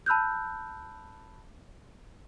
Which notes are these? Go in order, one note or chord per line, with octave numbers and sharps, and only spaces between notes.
A5 B5 E6 F#6 G6